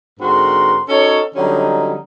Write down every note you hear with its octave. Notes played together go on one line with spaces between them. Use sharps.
G#2 D3 C4 F#4 A#4 C6
C#4 D#4 F#4 A4 C#5
D3 F#3 G3 C#4 D#4